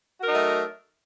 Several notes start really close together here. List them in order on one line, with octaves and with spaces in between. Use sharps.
F#4 A#4 D#4 F#3 A3